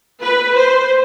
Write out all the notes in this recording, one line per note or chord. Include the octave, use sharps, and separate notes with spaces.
B4
C5